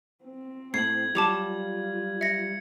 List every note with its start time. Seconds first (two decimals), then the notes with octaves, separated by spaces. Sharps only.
0.25 C4
0.74 A2 G#6 C7 F#7
1.15 F#3 G3 F4 A5 D6 F7
2.21 E5 A#6 C#7